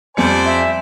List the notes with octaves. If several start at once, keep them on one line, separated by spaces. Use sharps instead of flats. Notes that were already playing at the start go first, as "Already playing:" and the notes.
F2 G3 C5 D5 G#5 C#7
E5